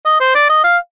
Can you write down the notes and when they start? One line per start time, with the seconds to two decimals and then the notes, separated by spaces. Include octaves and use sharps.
0.06 D#5
0.20 C5
0.35 D5
0.49 D#5
0.64 F5